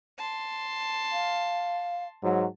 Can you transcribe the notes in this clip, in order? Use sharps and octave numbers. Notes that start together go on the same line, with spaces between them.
A5 C6
F5
G#2 F#3